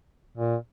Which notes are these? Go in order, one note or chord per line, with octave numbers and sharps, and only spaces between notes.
A#2